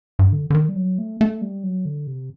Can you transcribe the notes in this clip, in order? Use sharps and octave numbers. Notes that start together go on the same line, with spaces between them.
G2
D3
D3
D#3
G3
F#3
A3
A3
G3
F#3
D3
C3